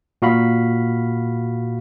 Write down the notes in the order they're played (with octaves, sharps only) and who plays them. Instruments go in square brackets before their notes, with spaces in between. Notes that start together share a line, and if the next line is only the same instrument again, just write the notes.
[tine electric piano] A#2 F#4 F5 B5